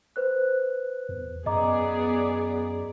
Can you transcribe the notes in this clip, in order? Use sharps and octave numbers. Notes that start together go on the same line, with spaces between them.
B4 C5 F#6
E2
F#2 B3 G#4 D5 D#5 A#5 D6